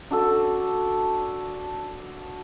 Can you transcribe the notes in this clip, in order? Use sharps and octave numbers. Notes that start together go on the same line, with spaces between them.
D4 F#4 A4